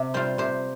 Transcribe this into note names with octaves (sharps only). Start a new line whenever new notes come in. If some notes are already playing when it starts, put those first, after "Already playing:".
Already playing: C3
G3 C4 F4 C5
C3 C5